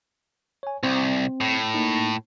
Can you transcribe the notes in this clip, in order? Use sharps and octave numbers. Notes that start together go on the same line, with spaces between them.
C#5 G#5
C2 C4
A2
A#3 D#4